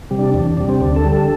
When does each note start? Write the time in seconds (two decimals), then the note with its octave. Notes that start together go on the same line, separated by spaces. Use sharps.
0.11 C3 G3
0.19 D4
0.34 E2 D4
0.57 C3 G3 D4
0.69 C4
0.80 D2 D4
0.96 A4
1.04 D3 G3
1.12 A4